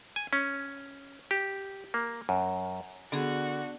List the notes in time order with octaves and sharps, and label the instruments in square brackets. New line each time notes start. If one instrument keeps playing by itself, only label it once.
[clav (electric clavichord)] G#5
C#4
G4
A#3
F#2
[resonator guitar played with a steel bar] D3 [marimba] B3 G#4 [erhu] F#4